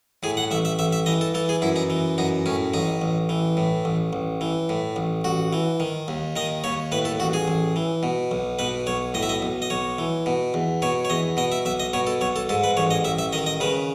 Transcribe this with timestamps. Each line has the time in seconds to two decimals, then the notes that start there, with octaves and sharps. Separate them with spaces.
0.23 A2 G#4
0.37 F#5
0.51 A1 E5
0.65 E5
0.79 A1 E5
0.93 E5
1.06 E3 D#5
1.21 A4
1.35 E3 A4
1.49 G#4
1.62 F#2 E4
1.76 D#4
1.90 E3
2.18 F#2 D#4
2.46 A2 C#4
2.74 A1 D#4
3.02 A1
3.29 E3
3.57 A2
3.85 A1
4.13 A1
4.41 E3
4.69 A2
4.96 A1
5.24 A1 F#4
5.53 E3
5.80 D#3
6.08 D#2
6.36 D#3 D#5
6.64 D#2 C#5
6.92 A2 B4
7.05 A4
7.20 A1 F#4
7.33 G#4
7.48 A1
7.76 E3
8.03 B2
8.31 B1
8.59 B2 B4
8.86 B1 C#5
9.14 A2 D#5
9.23 E5
9.29 D#5
9.42 B1
9.62 D#5
9.70 B1 C#5
9.98 E3
10.26 B2
10.54 E2
10.82 B2 C#5
11.05 C#5
11.10 E2 D#5
11.37 B2 D#5
11.52 E5
11.65 B1 E5
11.80 D#5
11.93 B2 C#5
12.07 A4
12.21 B1 C#5
12.36 A4
12.49 G#2 A4
12.64 B4
12.77 A1 C#5
12.91 D#5
13.04 A1 E5
13.19 E5
13.33 D#3 D#5
13.46 D#5
13.60 C#3 B4